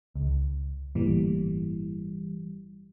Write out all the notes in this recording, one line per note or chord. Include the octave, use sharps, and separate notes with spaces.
C#2
G1 A2 E3 G3 A#3